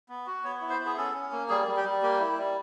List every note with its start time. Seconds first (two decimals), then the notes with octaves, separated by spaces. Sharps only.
0.09 B3
0.26 F#4
0.44 B3 C#5
0.61 E4
0.70 C5
0.79 B3
0.86 G#4
0.97 C#4 A4
1.14 C#4
1.32 A#3
1.49 G3 G#4
1.68 G3
1.77 G4
1.84 G3
2.02 A#3 G4
2.20 E4
2.38 G3